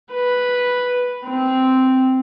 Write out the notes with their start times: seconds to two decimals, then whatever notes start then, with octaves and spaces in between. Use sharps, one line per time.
0.13 B4
1.26 C4